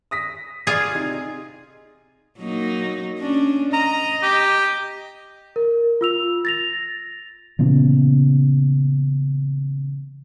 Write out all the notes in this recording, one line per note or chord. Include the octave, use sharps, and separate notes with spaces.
D#6 A#6 B6
F4 G#4 D5 D#6 G#6
C3 D#4
F#3 A#3 D#4
C#4 D4
D#5 A#5
G4
A#4
F4 E6 F7
A6 A#6 F7
A#2 C#3 E3 B3